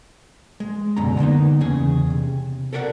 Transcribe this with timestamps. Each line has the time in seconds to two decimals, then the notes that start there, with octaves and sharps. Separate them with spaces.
0.60 G#3
0.96 C2 F#2 B2 D3 A#5
1.19 D3 A#3 B3 D#4
1.61 E2 C#3 G#4
2.10 C3
2.73 A4 A#4 D5 E5 F#5